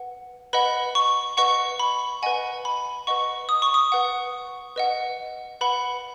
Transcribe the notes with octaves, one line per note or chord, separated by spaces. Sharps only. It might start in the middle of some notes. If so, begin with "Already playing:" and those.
Already playing: B4 F#5
B4 D#5 F#5 B5
C#6
B4 D#5 F#5 C#6
B5
B4 D#5 F#5 G#5
B5
B4 D#5 F#5 C#6
D#6
C#6
D#6
B4 F#5
B4 D#5 F#5
B4 F#5 B5